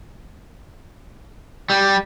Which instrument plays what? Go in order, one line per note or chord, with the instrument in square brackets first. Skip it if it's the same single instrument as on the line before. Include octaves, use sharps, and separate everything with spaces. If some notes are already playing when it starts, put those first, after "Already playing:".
[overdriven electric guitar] G3